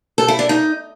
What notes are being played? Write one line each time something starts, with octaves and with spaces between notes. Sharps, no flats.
A4
E4
D4
D#4